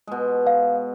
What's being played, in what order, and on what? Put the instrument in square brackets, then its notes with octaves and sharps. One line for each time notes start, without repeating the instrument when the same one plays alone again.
[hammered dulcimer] B2 G#3
[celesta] F5